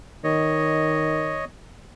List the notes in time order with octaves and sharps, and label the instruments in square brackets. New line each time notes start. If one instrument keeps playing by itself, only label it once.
[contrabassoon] D#3 [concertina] C#5 D#5